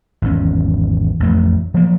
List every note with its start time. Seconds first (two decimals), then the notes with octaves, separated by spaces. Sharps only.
0.22 G#1 E2 C#4
1.20 A1 F2 A3
1.74 F3 F#3 A#3